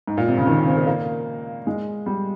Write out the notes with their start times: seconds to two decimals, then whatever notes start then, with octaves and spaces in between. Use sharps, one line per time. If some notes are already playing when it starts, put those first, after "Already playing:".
0.07 G#2
0.18 A#2
0.28 C3
0.38 C#3
0.47 D#3
0.58 C#4
0.67 C4
0.77 A#3
0.87 A#3
1.67 G#3
2.06 G3